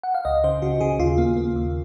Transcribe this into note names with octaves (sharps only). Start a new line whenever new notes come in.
F#5
F5
C#2 D#5
C#3 C5
C#3 F#4
C#3 G#4
D#2 F4
A#3
A#3
D#2